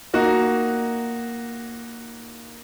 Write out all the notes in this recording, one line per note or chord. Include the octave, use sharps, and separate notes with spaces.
A#3 D#4 F#4